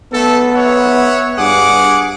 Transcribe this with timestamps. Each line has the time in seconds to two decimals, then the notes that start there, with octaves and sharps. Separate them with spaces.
0.12 A3 B3 A4
0.54 C#5 E5 F#5
1.38 G2 G#4 F#5 D6